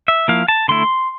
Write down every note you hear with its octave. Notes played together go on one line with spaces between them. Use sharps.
E5
F3 A#3 E4 F5
A5
D3 A3 E4 C6